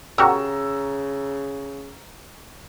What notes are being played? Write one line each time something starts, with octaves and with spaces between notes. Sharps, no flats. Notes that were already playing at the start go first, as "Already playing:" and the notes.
C#3 F#4 G4 A#4 A#5 C#6 E6